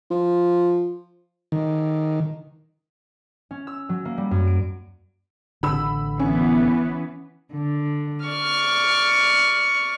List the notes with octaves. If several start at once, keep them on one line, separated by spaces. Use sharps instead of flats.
F3
D#3
C#4
E6
F#3
A#3
G3
F#2
D7
A1 D3 B5 E6
E3 B3 C#4
D3
D5 C#6 F6